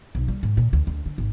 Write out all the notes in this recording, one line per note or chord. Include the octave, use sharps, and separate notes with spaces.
B1
G3
G#2
A#2
D2
D2
D3
G#1